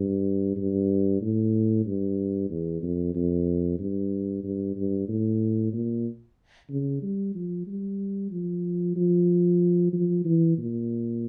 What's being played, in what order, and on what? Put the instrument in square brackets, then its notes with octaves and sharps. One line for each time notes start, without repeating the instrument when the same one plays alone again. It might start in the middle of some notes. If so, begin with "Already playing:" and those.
Already playing: [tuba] G2
G2
A2
G2
E2
F2
F2
G2
G2
G2
A2
A#2
C#3
G3
F3
G3
F3
F3
F3
E3
A#2